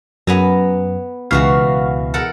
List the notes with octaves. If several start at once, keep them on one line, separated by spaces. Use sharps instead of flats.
F#2 B3 G#5 A#5
C#2 B2 E3 F#4 F5
A4 A#4 F#5